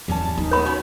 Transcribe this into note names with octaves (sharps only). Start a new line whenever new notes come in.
E2 E3 G3 C#4 A5
D#2 D#4
E3 B3 C#5 B5
F#3 C#4 F#4